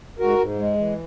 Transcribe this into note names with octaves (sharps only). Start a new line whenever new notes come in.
G#2 F#4 A#4
G#2
G#3
E3